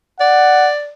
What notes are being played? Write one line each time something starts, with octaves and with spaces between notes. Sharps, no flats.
D5 F#5